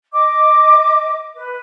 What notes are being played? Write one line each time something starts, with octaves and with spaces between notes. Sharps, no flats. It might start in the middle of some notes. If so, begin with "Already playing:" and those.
D#5 D6
B4